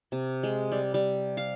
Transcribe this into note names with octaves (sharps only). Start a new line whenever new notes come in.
C3
G#3
G3
G3
F5